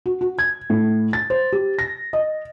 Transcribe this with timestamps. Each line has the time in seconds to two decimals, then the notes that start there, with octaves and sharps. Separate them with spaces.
0.06 F#4
0.21 F#4
0.39 G#6
0.70 A2
1.13 A6
1.30 C5
1.52 G4
1.79 A#6
2.13 D#5